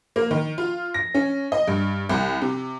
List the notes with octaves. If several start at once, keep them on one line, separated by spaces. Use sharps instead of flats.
A#3
D#3
F4
A#6
C#4
D#5
G2
C2
C3